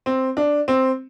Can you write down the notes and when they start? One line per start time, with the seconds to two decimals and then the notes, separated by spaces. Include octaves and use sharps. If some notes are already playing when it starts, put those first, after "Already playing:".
0.06 C4
0.37 D4
0.68 C4